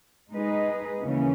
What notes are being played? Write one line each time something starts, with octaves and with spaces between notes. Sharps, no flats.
G#3 D#4 G#4 B4 D#5
D#2 C#3 E3 A#3 C#4